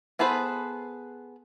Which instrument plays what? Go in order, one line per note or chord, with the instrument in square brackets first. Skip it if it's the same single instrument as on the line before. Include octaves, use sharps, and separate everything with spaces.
[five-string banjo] B3 G#4 A4 B4 C5